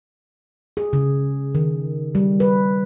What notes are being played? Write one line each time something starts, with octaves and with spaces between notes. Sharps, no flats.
G#4
C#3
D#3
G3
B4